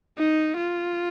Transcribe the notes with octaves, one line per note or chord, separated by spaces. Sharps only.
D#4
F4